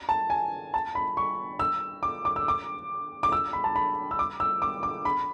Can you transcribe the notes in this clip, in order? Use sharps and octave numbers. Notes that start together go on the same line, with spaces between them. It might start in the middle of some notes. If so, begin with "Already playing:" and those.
A5
G#5
A5
B5
C#6
E6
D6
D6
E6
D6
D6
E6
B5
A5
B5
E6
D6
E6
D6
D6
B5